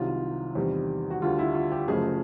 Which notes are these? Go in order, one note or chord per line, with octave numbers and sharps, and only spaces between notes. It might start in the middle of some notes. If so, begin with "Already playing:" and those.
Already playing: C2 C3 D#3 F#3 F4
E2 C3 D#3 G3 C4
F#4
D2 D3 G3 F4
E4
F4
G4
F#1 F#2 C#3 F3 A3 G#4